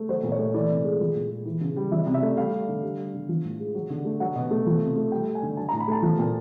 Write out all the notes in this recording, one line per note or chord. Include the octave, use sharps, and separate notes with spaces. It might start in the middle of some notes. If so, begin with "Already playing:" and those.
Already playing: A3
F#3 C5
A#2
C#5
A3
E3 D5
C3
G#3
F3
A#2
G#3
E3
C#3
G3
F3 E5
C3
E5
A3
G3 F5
G3
D3
G3
G3
D3
F3
A2
G#3
F#3
D3
A3
F#3 F#5
B2
A3
F3
C3
A3
G3 G5
G3
G#5
D3
F#3 A5
A#5
A2
B5
A3 A5
F3
A#2